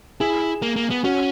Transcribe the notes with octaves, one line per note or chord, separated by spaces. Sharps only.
E4 G#4
A#3
A#3
B3
C#4 F#4